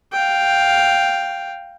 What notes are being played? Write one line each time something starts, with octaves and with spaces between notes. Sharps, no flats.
F5 G5